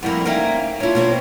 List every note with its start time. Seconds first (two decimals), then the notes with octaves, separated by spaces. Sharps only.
0.03 F2 G3 A#3 E4 F#5
0.25 A#3 C#4 D#4 E5 F5 G5
0.80 C#4 D4 E4 F4 C#5
0.95 B2 A#3 C4